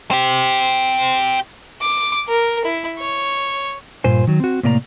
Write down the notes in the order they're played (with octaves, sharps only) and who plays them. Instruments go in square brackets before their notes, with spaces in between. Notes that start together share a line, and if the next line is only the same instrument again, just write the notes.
[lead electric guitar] C4 G4
[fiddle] D6
A#4
E4
C#5
[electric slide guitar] G2 A#2 F4 C5 G#5
D#3 F#3
C4 F#4
A2 C3 A#3 D5 A5 A#5